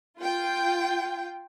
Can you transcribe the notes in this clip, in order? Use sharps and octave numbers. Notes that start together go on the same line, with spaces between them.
F4 G5